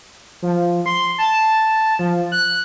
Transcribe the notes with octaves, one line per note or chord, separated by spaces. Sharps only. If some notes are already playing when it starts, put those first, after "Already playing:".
F3
C6
A5
F3
F#6